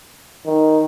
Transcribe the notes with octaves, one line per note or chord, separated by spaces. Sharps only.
D#3